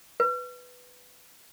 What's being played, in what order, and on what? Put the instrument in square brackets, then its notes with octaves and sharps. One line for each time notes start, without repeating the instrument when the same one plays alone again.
[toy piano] B4